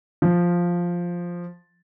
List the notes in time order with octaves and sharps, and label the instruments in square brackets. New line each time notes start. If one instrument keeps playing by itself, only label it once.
[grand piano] F3